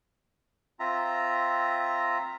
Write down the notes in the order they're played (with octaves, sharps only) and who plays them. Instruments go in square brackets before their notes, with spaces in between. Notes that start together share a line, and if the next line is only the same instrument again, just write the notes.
[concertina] C4 F4 E5 A#5